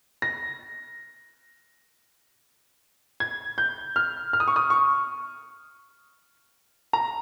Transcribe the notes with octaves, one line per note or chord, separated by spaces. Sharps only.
A#6
G#6
G6
F6
F6
D#6
C#6
D#6
C#6
A#5